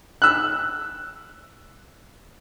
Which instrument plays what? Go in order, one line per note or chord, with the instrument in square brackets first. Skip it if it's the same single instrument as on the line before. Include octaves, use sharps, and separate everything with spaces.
[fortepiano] E6 F#6